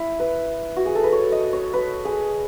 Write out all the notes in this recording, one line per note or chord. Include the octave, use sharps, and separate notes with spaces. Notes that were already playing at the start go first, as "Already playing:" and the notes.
Already playing: E4
B4
F#4
G#4
A4
B4
C#5
D#5
C#5
B4
G#4